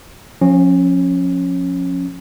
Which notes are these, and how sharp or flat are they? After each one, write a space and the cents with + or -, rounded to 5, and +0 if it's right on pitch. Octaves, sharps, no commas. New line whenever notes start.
F3 +30 C#4 -20